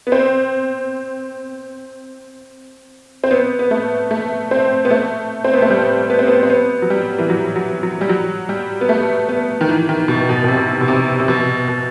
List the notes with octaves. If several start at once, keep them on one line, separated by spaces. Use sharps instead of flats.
B3
C4
C4
B3
B3
A3
A3
C4
B3
A3
C4
B3
A3
G3
B3
C4
B3
C4
B3
F#3
G3
E3
F#3
F#3
F#3
G3
F#3
G3
B3
A3
B3
D#3
E3
D#3
B2
B2
B2
C3
B2
C3
C3
B2
B2